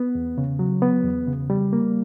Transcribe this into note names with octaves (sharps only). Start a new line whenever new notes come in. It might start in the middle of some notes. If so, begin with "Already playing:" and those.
Already playing: B3
E2
C#3
F#3
B3
E2
C#3
G3
A#3